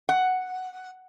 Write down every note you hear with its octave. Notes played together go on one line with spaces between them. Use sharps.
F#5